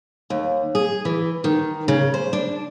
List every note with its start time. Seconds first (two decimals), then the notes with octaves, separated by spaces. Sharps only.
0.30 D#2
0.75 G#4
1.05 E3
1.44 D#3
1.88 C#3
2.14 C5
2.33 D4